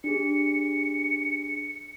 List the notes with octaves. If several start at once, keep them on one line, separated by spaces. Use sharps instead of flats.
D4 G4 G#4 C#7